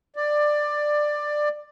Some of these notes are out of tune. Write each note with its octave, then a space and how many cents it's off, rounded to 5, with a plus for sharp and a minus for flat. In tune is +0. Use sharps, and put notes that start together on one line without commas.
D5 +15